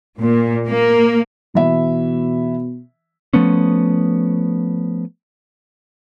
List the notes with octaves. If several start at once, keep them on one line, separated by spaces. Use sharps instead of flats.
A#2
A#3
B2 E3 E5
F3 A3 B3 C#4